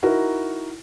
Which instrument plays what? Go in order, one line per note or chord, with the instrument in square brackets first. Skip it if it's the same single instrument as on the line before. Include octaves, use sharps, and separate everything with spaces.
[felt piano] D#4 E4 F#4 A#4